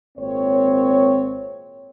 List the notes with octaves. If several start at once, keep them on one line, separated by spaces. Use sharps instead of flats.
G#1 A#2 C4 C#5